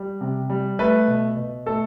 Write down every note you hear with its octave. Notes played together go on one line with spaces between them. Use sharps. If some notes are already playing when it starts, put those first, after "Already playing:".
Already playing: G3
C3
G3
A3 B4
B2
B2
A3 A4